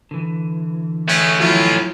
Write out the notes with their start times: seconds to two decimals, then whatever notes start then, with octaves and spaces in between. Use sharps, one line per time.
0.11 D3 E3
1.08 G#3 A3 C#4
1.40 F3 F#3 E4 F4